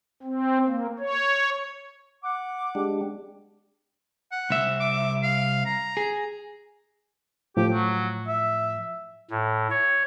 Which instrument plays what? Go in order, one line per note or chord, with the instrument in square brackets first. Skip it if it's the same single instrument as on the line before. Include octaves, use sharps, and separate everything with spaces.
[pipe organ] C4
A#3
C#5
[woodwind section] F#5 D6
[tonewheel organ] G#3 D4 G4
[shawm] F#5
[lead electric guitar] C2 E5
[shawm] D6
F5
A#5
[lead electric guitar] G#4
[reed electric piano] A2 F3 [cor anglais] G4
[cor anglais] F#3
E5
[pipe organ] A2
C#5